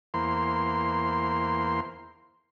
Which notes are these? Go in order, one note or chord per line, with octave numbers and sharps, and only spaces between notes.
E2 A#3 C5 C6